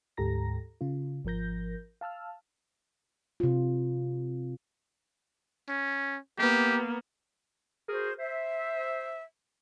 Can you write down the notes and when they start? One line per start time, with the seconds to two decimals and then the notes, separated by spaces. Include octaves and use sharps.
0.17 D2 G#2 G4 A4 A#5 A#6
0.81 C#3 F4
1.25 G#1 F3 A#4 G6 A#6
2.01 F5 A5 E6 F6
3.40 C3 F4
5.69 C#4
6.38 A#3 B3 G4
7.89 F#4 G#4 A#4 C5
8.19 C5 E5